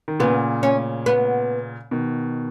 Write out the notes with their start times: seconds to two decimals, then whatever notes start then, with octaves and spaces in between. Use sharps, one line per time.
0.08 D#3
0.20 A#2 C#3 B3
0.63 C#4
1.06 B3
1.91 B2 D#3